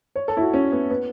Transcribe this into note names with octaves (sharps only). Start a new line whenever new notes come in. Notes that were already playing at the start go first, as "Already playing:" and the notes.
C#5
A4
E4
F#4
C#4
B3
B3